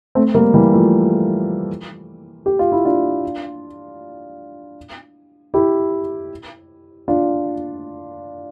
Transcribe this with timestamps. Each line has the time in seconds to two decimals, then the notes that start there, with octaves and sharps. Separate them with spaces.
0.15 A3 C4
0.34 G3 A#3
0.54 E3 G3
0.73 F3 A3
2.46 G4
2.59 F4
2.72 E4
2.85 D4 F4
5.54 E4 G4
7.08 D4 F4